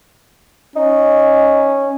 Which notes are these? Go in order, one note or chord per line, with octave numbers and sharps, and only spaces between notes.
C#4 D#4